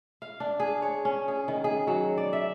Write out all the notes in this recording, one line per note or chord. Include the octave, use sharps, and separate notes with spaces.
F5
D4
G#4
C#5
C#4
G#4
D#3
G#4
F#3
D5
E5